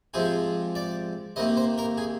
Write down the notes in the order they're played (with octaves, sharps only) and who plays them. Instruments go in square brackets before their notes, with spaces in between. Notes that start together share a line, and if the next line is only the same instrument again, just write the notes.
[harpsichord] C3 F3 G#3 G#4
D5
C3 D#3 A#3 D#5
C5
A#4
G#4